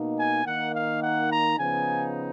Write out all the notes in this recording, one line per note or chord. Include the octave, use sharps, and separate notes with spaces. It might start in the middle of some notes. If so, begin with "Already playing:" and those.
Already playing: B2 A#3 D#4
G#5
D#3 A#3 D#4 F#5
F5
F#5
A#5
C#3 F3 B3 D#4 G#5